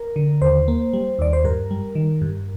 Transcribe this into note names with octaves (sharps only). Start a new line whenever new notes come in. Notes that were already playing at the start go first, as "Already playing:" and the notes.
Already playing: A#4
D3
D#2 C5
A#3
G3
D#2 D5
C5
G2 A#4
G3
D#3
G2